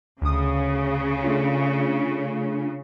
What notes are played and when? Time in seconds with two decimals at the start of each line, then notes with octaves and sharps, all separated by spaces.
0.21 D2 C#3 D#6
1.23 A3 D4 F4